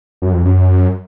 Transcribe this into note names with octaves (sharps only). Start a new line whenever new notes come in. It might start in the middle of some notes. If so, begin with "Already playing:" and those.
F#2
F2
F#2